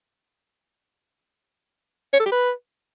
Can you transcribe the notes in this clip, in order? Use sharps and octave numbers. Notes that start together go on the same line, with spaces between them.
C#5
A4
G4
B4